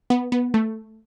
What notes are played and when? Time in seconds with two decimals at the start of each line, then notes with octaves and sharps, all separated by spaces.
0.10 B3
0.32 B3
0.54 A3